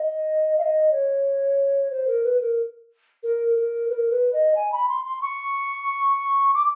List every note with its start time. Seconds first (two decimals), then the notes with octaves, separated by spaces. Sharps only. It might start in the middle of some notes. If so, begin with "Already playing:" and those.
Already playing: D#5
0.58 F5
0.62 D#5
0.91 C#5
1.91 C5
2.07 A#4
2.24 B4
2.40 A#4
3.23 A#4
3.56 A#4
3.89 B4
3.93 A#4
4.10 B4
4.33 D#5
4.55 G#5
4.72 B5
4.88 C6
5.04 C6
5.22 C#6
6.54 D6